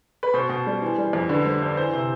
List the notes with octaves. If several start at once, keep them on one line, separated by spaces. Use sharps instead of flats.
B4
B2 C5
B2
G3
E3
G3
F2
D3 B4
G3 C5
G2 C5
E3 C5
C3